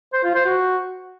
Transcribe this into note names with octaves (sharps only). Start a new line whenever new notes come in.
C5
F4
C5
F#4